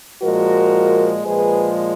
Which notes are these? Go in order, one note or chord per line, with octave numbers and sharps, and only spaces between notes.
A#2 F3 G#3 F#4 A#4
A#2 F3 G#3 G#4 B4